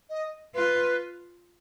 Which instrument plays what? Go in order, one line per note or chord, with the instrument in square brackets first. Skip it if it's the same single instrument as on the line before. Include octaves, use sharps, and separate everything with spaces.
[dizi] D#5
[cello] F4 [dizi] B4